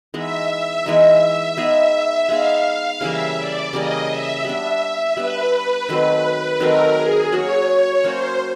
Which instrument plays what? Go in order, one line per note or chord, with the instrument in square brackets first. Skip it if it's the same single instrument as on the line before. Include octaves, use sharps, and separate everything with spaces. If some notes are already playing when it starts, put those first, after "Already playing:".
[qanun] E3 G#3 B3 D#4 [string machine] E5
[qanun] E3 G#3 B3 D#4 [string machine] E5
[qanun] G#3 B3 D#4 G#4
[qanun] G#3 B3 D#4 G#4 [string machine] F5
[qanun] C#3 E3 G3 A#3 [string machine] E5
[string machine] D5
[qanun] C#3 E3 G3 A#3 [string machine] D#5
[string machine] E5
[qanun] G3 B3 D4 [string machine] E5
[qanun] G3 B3 D4 [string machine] B4
[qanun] D#3 F#3 A3 C4
[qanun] D#3 F#3 A3 C4 [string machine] A#4
[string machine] G#4
[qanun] F#3 A#3 C#4 F#4 [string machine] C#5
[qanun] F#3 A#3 C#4 F#4 [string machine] C5